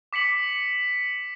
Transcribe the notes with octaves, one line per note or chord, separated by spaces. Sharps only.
D6 B6 C#7 F#7